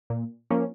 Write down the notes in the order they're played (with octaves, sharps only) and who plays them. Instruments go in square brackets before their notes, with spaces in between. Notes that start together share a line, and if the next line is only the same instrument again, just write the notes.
[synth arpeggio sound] A#2
F3 A#3 C#4